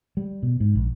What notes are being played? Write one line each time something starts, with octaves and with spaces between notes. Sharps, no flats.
G3
B2
G#2
A#1